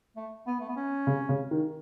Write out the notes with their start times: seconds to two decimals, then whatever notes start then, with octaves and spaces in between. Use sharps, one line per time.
0.17 A3
0.47 B3
0.60 A3
0.68 B3
0.76 C#4
1.07 C#3
1.29 C#3
1.51 D#3